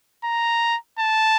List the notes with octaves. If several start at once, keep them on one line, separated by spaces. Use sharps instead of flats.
A#5
A5